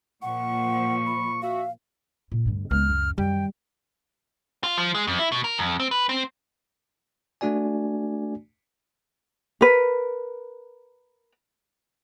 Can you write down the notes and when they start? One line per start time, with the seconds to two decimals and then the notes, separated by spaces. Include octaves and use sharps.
0.22 A#2 F3 F#5 C#6
1.06 B5
1.42 F#4 E5 F5
2.32 A#2
2.46 D2 G2
2.71 C#2 G#3 B3 F6
2.89 F#2
3.18 F#2 D#3 G3 G5
4.64 F4
4.78 F3
4.95 G#3
5.07 F2
5.19 E4
5.32 B2
5.44 A#4
5.58 F2
5.80 C4
5.91 B4
6.09 C4
7.41 A3 D4 F#4 D5 G#5
9.61 A#4 B4